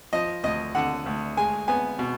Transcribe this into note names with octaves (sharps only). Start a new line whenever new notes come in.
F3 D#5
D2 D#5
D3 F#5
D2
G#3 G#5
B3 G#5
B2